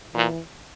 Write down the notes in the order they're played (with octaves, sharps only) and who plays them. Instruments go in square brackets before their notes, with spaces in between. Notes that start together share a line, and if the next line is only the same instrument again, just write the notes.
[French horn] A#2 [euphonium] E3